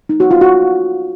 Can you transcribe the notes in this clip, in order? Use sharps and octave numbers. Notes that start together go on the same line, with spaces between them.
D#4
F#4
F4
F#4